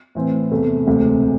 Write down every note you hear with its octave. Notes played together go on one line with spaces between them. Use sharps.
A2 E3 C4
E2 C3 A3
E1 D2 C3 A3